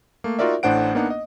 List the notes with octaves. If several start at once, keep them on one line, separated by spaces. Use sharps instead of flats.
A3 A#3
D#4 F4 F#4 A#4 D5 E5
A1 A2 D4 C5 F#5 D7
A#3 B3 D4 D#4 F#5
D#5